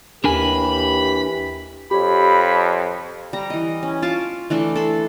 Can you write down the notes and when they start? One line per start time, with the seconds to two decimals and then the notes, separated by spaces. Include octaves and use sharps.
0.24 D#2 E3 D4 G4 A#4 G#5 B5
1.91 F2 G4 C#5 B5
3.33 G3 A#5
3.50 E3 D#5
3.83 C#4
4.02 F4 A5 C#6 D6
4.50 E3 A3 D4 A4
4.75 A4 A5 B5 C6